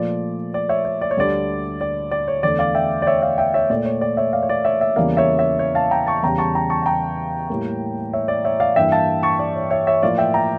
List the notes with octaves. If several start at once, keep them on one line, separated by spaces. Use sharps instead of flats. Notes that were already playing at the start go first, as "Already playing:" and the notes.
Already playing: A#2 F3 A3 D5
D5
C#5 E5
C#5
D5
C#5
D2 D3 G3 D5
D5
D5
C#5
E2 D3 A3 D5
D5 F5
E5 G5
D5
C#5 E5
D5 F5
E5 G5
C#5 E5
A#2 A3 D5
C#5
D5
C#5 E5
D5 F5
C#5
D5
C#5 E5
C#5 E5
E2 C#3 E3 G3 A#3 D5 F5
C#5 E5
C#5 E5
C#5
F5 A5
G5 A#5
A5 C#6
E2 C#3 G3 G5 A#5
A5 C#6
G5 A#5
A5 C#6
A5
G5 A#5
A2 G3 A#3
C#5 E5
D5
C#5 E5
D5 F5
G2 E3 G3 A#3 E5 G5
F5 A5
A5 C#6
D5
C#5
C#5 E5
C#5 E5
A2 F3 A#3 D5 F5
E5 G5
G5 A#5